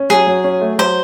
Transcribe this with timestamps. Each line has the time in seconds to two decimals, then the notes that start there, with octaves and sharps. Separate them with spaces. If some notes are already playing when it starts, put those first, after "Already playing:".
Already playing: C#4
0.10 F#3 G#4
0.27 F#3
0.44 C#4
0.61 A3
0.78 F#3 C5